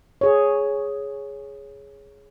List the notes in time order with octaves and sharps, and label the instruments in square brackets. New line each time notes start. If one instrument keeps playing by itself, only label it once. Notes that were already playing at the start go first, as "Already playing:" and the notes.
[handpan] G#4 C#5